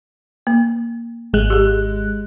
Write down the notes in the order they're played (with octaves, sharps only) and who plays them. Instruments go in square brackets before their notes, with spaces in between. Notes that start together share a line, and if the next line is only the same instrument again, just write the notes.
[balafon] A#3
[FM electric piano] G#1 G#3 F#6
[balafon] G4 G#4